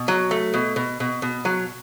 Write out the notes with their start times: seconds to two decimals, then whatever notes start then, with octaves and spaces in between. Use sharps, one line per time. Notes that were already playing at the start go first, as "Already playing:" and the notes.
Already playing: B2
0.08 F#3
0.31 A3
0.54 B2
0.76 B2
1.00 B2
1.22 B2
1.45 F#3